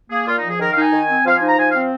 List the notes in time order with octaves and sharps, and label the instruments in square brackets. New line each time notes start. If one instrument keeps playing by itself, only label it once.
[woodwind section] A#3 G#4
A#2 F4
D#4
F3 G#4
D#3 A#4
F5
D#4
G#5
D#3
C4
F3 F5
D#4 G#5
A#5
F3 G#5
F5
C4